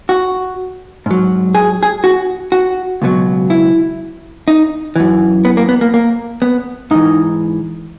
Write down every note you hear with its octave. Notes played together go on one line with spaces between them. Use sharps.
F#4
G#2 F#3
G#4
G#4
F#4
F#4
C#2 B2 F#3
E4
D#4
F#2 E3
B3
A#3
B3
A#3
A#3
B3
G#2 E3 D#4